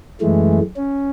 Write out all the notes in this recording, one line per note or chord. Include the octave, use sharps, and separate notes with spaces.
F#2 E3 G#3 A3
C#4